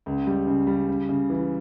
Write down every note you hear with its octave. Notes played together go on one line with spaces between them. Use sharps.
C#2
G3
C#3
G3
C#3
C#3
E3